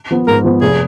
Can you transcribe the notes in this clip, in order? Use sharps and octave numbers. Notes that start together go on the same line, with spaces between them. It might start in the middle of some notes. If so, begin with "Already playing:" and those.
F3 B3
G#2 A#4
F3 B3
F1 G#4